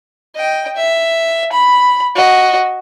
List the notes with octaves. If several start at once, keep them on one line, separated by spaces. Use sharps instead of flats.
D#5 G5
E5
B5
F#4 D#5